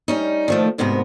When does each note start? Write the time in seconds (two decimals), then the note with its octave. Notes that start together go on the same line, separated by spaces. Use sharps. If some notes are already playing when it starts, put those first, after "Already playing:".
0.08 G3 C#4 D#4
0.48 D#3 F3 A3
0.78 D2 G#2 C3 B3 A#4